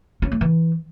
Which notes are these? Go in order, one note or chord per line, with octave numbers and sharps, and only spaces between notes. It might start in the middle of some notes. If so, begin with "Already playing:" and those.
C#4
A3
E3